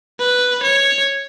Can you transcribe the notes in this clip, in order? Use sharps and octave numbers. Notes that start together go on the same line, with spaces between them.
B4
C#5